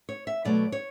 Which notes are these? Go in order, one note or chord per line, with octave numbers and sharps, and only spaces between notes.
C#5
E5
B2 F#3 A3 D5
C#5